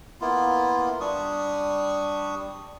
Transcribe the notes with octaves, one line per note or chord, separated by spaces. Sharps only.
A#3 B3 E4 F4
G3 D4 C#6 D#6